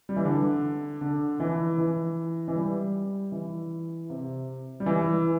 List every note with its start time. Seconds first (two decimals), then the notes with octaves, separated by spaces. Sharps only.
0.09 G3
0.16 E3
0.25 D3
1.01 D3
1.40 E3
1.78 E3
2.48 E3
2.55 G3
3.32 E3
4.10 C3
4.80 G3
4.86 E3